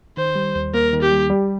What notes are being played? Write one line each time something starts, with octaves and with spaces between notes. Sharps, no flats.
D#3 C5
G3
D#2
A#3 A#4
D#3
G4
G3
G3